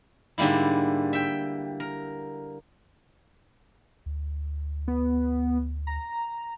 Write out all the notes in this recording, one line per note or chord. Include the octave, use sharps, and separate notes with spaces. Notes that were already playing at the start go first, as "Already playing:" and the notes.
G#2 D3 G3 A#3 E4
E5 G5
A#4
D2
B3
A#5